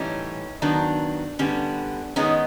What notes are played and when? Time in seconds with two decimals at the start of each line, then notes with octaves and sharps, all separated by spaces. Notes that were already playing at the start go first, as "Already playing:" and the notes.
Already playing: A2 E3 G3 C#4 D#4
0.62 D#3 F#3 B3 D4
1.39 D3 G3 B3 C#4
2.16 D#3 G#3 B3 C#4 D#4